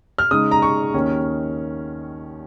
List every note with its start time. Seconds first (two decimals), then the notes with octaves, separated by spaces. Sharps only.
0.18 F6
0.31 C#3 G#3 D#4 D#6
0.51 A#5
0.62 C#6
0.94 D#2 D#3 C#4